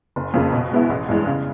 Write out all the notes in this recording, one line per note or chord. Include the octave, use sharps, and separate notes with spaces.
F#1
F2 C#3 F3 A#3
B2
G#3 B3 E4
A1
G2 E3 G#3
C#3